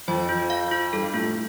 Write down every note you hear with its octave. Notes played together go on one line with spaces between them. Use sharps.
F2 F3 C5
F4
F5
F4
G2 G3 A4
A2 A3 F4